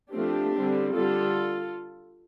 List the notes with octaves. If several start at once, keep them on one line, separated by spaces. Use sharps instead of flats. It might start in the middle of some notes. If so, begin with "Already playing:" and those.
F3 A3 C4 D4 G4
D3 G3 C4
D3 G3 D4 F4 A4